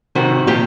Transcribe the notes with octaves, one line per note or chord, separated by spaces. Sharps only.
C3 D#3 F#4
A#2 G4